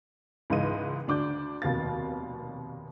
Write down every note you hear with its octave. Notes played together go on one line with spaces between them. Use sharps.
C#2 G#2 E3 D#5 D#7
D2 D4 D6 G6
F1 D#2 B2 F5 A6